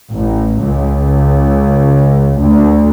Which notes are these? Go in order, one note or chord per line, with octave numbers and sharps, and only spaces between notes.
A1
C#2
D2